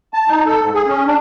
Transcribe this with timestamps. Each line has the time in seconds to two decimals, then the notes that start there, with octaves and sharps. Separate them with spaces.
0.13 A5
0.28 D#4
0.46 A4
0.62 G#2
0.74 G#4
0.87 C#4
1.06 D4